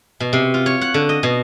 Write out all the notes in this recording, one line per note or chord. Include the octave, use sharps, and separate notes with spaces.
B2
C3
F4
C#5
F#5
D3
D#5
B2